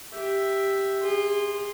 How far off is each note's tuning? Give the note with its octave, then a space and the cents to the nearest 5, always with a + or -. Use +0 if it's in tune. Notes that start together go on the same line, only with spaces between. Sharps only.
G4 +0 E5 +0
G#4 -30 C6 +0